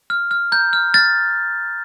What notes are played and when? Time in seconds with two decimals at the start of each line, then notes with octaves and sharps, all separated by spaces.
0.10 F6
0.31 F6
0.52 A#5 G6
0.73 F6
0.94 F6 A6